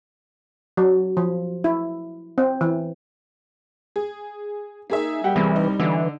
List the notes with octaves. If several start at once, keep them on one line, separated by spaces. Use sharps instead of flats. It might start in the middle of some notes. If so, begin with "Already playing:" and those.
F#3
F3
E4
C4
E3
G#4
A#3 D#4 G#4 E5
G3 G4 F#5 G5
C2 E3
D#4
D3 E3